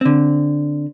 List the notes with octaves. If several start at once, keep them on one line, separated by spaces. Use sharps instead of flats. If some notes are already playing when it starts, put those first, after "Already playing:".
D3 C4